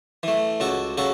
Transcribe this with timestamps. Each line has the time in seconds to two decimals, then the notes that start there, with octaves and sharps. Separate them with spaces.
0.23 E3 A3
0.60 C#2 F#4 A4
0.98 C#3 F#4 A4